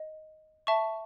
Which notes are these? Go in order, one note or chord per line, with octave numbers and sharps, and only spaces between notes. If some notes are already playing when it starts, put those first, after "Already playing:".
Already playing: D#5
E5 A5 C#6